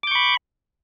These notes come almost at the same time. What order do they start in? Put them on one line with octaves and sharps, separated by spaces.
D6 G6 C#6 B5